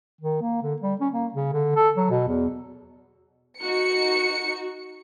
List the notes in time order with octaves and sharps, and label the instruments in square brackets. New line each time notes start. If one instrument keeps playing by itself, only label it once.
[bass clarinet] D#3
A#3
D3
G3
C#4
A#3
C#3
D3
A4
F#3
B2
E2
[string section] D#4 C#7 [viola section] F#4